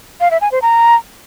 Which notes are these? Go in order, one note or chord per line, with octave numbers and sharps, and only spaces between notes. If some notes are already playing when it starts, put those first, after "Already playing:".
F5
E5
G#5
C5
A#5